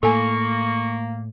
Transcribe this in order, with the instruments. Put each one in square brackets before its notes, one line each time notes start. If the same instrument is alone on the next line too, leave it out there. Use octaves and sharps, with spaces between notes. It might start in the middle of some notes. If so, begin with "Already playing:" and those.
[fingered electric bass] A2 A3 [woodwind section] A#3 [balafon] A4 G#5 [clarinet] C#6